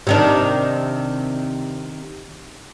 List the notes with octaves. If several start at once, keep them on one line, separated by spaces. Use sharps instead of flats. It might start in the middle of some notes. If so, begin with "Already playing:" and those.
C3 D#3 D4